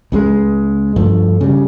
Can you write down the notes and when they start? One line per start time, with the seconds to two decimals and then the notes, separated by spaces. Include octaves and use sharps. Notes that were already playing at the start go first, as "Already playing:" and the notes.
0.12 C#2 C#3 G3 G#3
0.96 G2 F3 A3
1.41 C#3 G3